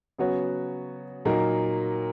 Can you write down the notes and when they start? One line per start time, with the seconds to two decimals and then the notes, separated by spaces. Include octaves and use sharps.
0.19 C#3 F#3 B3 F#4 C#5
1.25 A#2 F#3 A#3 D#4 A#4